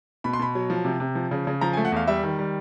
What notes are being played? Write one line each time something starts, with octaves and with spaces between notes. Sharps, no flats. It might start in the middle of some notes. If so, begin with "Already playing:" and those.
B2 B5
C6
B2 B5
F#3
F3
C3
C3
F3
C#3
C#3
F3 A#5
G#5
A3
F#5
E2 F5
G3 E5
D#3
G3